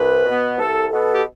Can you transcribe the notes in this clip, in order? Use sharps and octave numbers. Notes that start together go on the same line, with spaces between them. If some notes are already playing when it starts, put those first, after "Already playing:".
Already playing: C2 B4
B2 B3
C2 A4
B2 B3 A4
G4